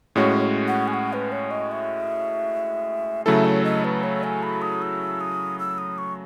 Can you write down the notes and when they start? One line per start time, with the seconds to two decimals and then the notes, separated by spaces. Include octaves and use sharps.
0.16 A2 G#3 C#4 F#4 C#5
0.68 F#5
0.88 G#5
0.94 F#5
1.13 B4
1.32 C#5
1.51 D#5
1.71 E5
3.26 C#3 F#3 A3 E4 A4 E5
3.45 C#5
3.64 D#5
3.85 B4
4.03 C#5
4.23 G#5
4.43 B5
4.62 D#6
4.82 E6
5.21 D#6
5.59 E6
5.78 D#6
5.98 C#6